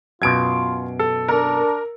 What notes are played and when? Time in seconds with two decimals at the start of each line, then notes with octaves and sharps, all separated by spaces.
0.22 F#2 B2 F4 G#6 D7
0.99 A4
1.28 D4 A#4